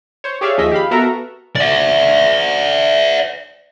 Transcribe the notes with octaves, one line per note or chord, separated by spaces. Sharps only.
C5 C#5
G4 G#4 C#5 D5 E5 F5
D#2 F3 G#4 D#5 E5 B6
G4 F5 B5
B3 F#4 A4 A#4 E5 A#5
D5 E5